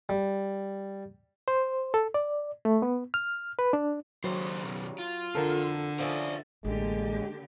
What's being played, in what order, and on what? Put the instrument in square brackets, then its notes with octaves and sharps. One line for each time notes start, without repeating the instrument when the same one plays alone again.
[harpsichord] G3
[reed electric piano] C5
A4
D5
A3
B3
F6
B4
D4
[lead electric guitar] D#2 C5 [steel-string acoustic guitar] C#3 G3 [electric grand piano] F#3
[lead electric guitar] B2 D#3
F4
[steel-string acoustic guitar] F2 [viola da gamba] D3 [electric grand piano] A4 A#4
[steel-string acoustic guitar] F3 C#4 [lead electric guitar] D5 E5
[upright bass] A1 [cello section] D3 A#3 G4 [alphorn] G#3